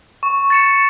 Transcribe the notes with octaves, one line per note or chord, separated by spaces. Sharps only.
C#6
A6 C#7 E7